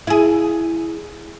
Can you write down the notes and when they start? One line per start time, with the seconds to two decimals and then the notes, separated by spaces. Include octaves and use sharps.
0.07 E4 G#4